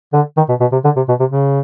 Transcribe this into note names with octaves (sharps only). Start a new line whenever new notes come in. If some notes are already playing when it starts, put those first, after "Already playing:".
D3
D#3
B2
B2
C3
D3
C3
B2
C3
C#3